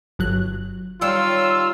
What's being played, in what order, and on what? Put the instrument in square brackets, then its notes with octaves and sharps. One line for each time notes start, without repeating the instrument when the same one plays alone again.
[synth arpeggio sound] G1 F#3 F#6
[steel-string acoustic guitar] D#3 G3 C#5 [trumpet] F4 [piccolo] E6